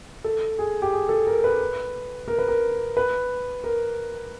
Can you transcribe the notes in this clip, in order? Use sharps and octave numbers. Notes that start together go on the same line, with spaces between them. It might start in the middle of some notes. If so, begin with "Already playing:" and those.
A4
G#4
G4
G#4
A4
A#4
B4
A#4
B4
A#4
B4
A#4